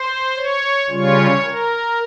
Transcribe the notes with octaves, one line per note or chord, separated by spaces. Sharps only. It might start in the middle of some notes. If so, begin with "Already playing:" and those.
Already playing: C5
C#5
C#3 G3 C#4 F4 C#5
A#4